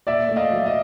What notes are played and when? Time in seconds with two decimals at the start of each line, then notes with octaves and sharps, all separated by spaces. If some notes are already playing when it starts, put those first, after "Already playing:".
0.07 A#2 D5 E5
0.29 A3
0.36 D#5 F5
0.52 F#3
0.66 D#5 F5